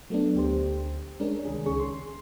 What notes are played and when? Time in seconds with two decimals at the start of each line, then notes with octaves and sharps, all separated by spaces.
0.10 F#3 A3 B3 D4
0.35 D2 G4 C5
1.20 G#3 C#4 D4 A#4
1.45 C2 D#3 G#4
1.65 C#2 C#4 G#4 C#6
1.80 C6